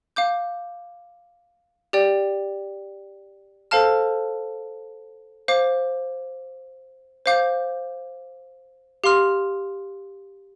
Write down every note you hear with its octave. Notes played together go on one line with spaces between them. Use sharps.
F5 D6 G6
G4 D5 G5
A4 C5 F5 A5 F6
C5 F5 D6
C5 F5 D6 G6
G4 F5 C6 F6